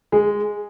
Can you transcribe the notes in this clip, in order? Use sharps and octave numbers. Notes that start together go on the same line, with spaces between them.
G#3